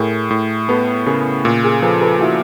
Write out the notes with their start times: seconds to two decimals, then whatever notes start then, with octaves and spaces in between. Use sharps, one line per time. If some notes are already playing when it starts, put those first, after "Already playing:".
Already playing: A2 G#4 A#4
0.30 A2
0.68 B3 A4 B4
1.06 C#3 G#4 A#4
1.45 A#2
1.63 G#4 A#4
1.82 F3 A4 B4
2.01 A4 B4
2.20 E4 F#4